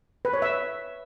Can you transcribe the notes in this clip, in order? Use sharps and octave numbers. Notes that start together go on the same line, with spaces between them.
B4
C#5
E5